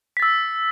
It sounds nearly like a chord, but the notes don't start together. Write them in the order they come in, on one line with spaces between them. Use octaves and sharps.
B6 A6 E6